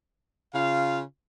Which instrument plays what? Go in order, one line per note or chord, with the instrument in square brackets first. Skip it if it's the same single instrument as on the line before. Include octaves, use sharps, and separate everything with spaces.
[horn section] C#3 F4 F5